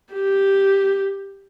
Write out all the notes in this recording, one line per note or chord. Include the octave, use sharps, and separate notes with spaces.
G4